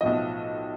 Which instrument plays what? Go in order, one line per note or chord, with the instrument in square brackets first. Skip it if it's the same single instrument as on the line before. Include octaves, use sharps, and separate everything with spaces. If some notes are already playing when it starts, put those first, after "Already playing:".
[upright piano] B1 A2 F3 D#5